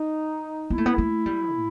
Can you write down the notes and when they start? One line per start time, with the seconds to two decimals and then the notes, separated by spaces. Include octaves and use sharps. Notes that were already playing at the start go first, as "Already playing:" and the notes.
Already playing: D#4
0.70 B3 E4
0.78 A3
0.86 B3
0.98 A3
1.26 G3
1.54 A2